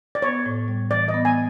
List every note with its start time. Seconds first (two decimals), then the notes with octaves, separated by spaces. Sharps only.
0.15 D5
0.22 B3 C#5
0.46 A2
0.68 G3
0.90 E3 D5
1.08 D#5
1.14 B3
1.25 G#5